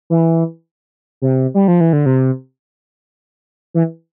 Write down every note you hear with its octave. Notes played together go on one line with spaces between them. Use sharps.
E3
C3
G3
F3
E3
D3
C3
E3